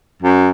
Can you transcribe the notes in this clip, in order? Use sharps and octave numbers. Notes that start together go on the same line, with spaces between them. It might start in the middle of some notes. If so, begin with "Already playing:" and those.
F#2